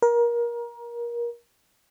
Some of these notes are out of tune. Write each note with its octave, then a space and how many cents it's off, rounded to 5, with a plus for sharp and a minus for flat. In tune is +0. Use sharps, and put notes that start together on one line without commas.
A#4 +25